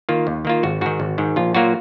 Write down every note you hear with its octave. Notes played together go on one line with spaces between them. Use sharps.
D#3 A#3 F4
D#2
D#3 A#3 F4
G#1 F#4
G#2 D#3 F#4
G#1
G#2 D#3
A#1 F4
A#2 F#3 A#3 F4 F#4